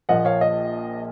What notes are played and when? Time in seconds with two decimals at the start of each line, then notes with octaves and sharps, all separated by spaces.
0.09 A#1 A#2 F3 D#5 F#5
0.25 C#5 F5
0.41 D#5